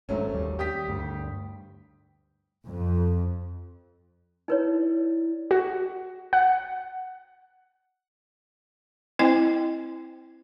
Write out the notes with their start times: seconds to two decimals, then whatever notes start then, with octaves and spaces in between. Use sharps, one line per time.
0.09 G#1 G#2 F#3 A3 C#4
0.33 D#2 G3
0.59 G4 D#6 B6
0.88 D2 G2 G3
2.66 F2
4.48 D#4 E4 B4 C#5 D5
5.51 F#4
6.33 F#5
9.19 C4 E4 C5 D#5 G5 G#5